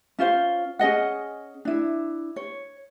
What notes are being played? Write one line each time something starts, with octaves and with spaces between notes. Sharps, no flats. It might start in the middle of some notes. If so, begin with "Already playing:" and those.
C#4 F4 C5 F5
C#4 G#4 D#5 F#5
D4 E4
C#5